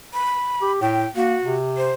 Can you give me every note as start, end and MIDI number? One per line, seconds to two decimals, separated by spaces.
0.14 0.72 83
0.61 0.81 67
0.81 1.06 45
0.81 1.06 79
1.16 1.36 58
1.16 1.54 66
1.44 1.93 48
1.77 1.94 72